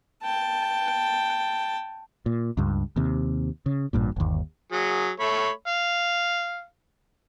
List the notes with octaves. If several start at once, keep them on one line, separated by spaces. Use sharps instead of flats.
G5 A5
A#2
C#2 G2
D#2 C3
C#3
A1 G2 A#2
G1 D#2
F#3 G#4
A3 C#5 B5
F5